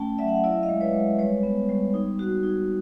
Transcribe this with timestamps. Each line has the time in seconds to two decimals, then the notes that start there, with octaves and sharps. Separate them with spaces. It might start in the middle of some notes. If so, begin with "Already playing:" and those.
Already playing: A3 C#4 G5 A5
0.18 F#3 D5 E5
0.28 F#5
0.35 F5
0.44 E4 D5 E5
0.63 D#5 F5
0.69 G#3
0.81 B4 C#5
0.93 G#3
1.19 G3 B4 C#5
1.43 B3
1.69 G3
1.94 D#4
2.19 F#4
2.43 D#4